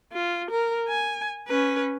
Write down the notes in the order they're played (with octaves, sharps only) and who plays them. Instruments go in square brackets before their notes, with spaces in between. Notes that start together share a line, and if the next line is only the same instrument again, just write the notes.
[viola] F4
A#4
G#5
C#4 B4